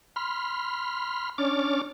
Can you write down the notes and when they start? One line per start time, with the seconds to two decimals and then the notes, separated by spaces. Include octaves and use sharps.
0.16 B5 C6 F6
1.38 C#4 D4 C#5 D6 F6 A6